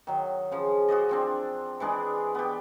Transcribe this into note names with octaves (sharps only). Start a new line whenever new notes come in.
D#3 F#3
C#3 F3
F#4 C5 D5 D#5
F3 C4 D4
E3 G#3 D4 G#4
B3 G4